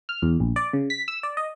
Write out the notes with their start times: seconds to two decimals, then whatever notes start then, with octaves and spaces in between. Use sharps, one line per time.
0.09 F6
0.22 E2
0.40 A#1
0.56 D5
0.73 C#3
0.90 B6
1.08 E6
1.23 D5
1.37 D#5